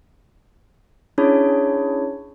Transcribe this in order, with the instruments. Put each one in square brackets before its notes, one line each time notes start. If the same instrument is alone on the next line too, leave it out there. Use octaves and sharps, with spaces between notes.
[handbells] C#4 D4 E4 G#4 C#5